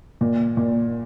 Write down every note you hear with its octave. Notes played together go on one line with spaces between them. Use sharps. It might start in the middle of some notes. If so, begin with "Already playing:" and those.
A#2
A#2